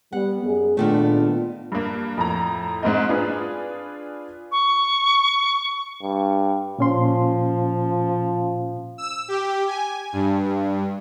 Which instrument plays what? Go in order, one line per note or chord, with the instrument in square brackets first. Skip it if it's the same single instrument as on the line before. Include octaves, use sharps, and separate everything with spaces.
[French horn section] G3 B3 [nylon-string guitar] F#5
[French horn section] F#2 G#4
[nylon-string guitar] A#2 D#3 A3 [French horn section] B3 D4 F4
[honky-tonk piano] G2 A#3
F2 A2 A#5
G#2 A#3 C4 A#4 D#5
D4 F4 G#4 B4
[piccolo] C#6
[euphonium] G2
[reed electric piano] A#2 C#4 C6 [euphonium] F3
[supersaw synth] E6
G4
G#5
G2